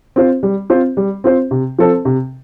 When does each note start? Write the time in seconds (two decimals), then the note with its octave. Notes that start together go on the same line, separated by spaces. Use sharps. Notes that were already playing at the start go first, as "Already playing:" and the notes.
0.16 C4 F4 C5
0.43 G3
0.70 C4 F4 C5
0.97 G3
1.24 C4 F4 C5
1.51 C3
1.79 F3 C4 A4 C5
2.05 C3